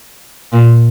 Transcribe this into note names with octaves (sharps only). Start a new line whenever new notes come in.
A#2